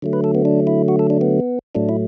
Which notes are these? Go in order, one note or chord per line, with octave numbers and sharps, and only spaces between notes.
D3 F#3 A3
B4
A4
B3
D4
E4
F#4
A4
D4
B3
A2 F#3 A3 D4
E4